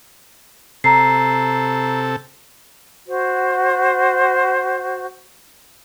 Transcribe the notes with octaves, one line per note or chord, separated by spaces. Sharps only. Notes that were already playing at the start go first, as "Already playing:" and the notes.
C3 A4 A#5 C7
F#4 C5